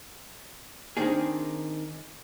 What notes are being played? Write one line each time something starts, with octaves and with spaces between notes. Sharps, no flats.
D#3 C4 D4 D#4 G#4